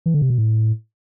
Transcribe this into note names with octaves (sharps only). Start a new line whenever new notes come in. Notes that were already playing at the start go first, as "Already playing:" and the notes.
E3
D3
C3
B2
A2